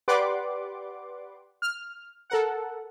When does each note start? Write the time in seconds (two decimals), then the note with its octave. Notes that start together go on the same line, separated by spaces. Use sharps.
0.08 G4 B4 D5 F#5 C6 D6
1.62 F6
2.30 A4 A#4 F#5